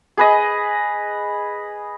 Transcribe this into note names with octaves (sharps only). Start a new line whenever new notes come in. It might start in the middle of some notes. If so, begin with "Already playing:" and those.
G#4 B4 D#5